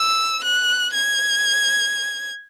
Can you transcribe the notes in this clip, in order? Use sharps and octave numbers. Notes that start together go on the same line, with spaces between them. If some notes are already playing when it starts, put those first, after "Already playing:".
Already playing: E6
F#6
G#6